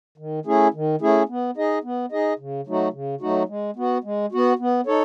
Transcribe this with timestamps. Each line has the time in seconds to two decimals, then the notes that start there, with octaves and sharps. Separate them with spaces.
0.18 D#3
0.45 A3 C#4 E4 G#4
0.74 D#3
1.01 A3 C#4 E4 G#4
1.29 B3
1.57 D#4 G#4 D#5
1.84 B3
2.12 D#4 G#4 D#5
2.39 C#3
2.67 F#3 A3 D#4 F#4
2.93 C#3
3.21 F#3 A3 D#4 F#4
3.49 G#3
3.76 B3 F#4
4.04 G#3
4.32 B3 F#4
4.59 B3
4.86 D#4 A4 C#5